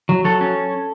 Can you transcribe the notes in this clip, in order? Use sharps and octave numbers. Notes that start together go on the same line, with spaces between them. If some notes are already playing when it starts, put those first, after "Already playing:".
F#3
F#3 A4
C#4